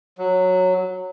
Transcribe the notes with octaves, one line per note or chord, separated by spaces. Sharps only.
F#3